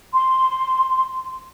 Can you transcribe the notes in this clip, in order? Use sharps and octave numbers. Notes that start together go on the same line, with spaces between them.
C6